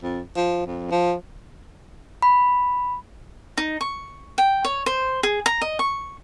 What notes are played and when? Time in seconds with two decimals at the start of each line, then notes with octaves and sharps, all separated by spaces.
0.02 F2
0.36 F3
0.66 F2
0.91 F3
2.22 B5
3.58 D#4
3.81 C#6
4.38 G5
4.65 C#5
4.86 C5
5.23 G#4
5.46 A#5
5.61 D#5
5.79 C#6